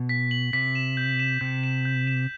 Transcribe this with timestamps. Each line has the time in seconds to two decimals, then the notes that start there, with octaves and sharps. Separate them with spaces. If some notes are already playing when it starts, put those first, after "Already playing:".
Already playing: B2
0.09 B6
0.31 F#7
0.53 C3 B6
0.75 E7
0.97 G6
1.19 E7
1.41 C3 G6
1.64 E7
1.85 G6
2.07 E7